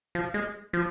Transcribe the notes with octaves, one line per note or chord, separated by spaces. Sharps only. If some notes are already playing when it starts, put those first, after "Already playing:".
F3
G#3
F3